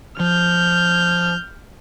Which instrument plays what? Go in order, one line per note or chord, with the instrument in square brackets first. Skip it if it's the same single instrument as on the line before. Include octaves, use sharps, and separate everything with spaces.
[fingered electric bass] F3 [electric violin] F6 G6